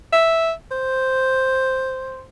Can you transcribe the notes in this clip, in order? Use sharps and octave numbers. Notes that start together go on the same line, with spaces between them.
E5
C5